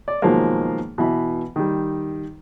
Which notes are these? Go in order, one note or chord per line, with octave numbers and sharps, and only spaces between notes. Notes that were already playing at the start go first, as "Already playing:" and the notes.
D5
B2 D#3 F3 F#3 G#3 A#3
B2 E3 B5
D#3 G3